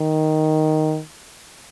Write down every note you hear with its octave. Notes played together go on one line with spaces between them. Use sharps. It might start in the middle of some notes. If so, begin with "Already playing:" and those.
Already playing: D#3